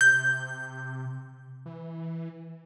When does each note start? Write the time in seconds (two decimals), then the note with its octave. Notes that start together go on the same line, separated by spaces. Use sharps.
0.01 C3 G6
1.66 E3